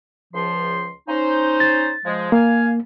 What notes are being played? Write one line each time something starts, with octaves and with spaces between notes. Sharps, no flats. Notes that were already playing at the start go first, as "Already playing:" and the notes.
C#2 F3 C6
C#4 D#4 C5
A6
F3 G#3
A#3 F5 G#5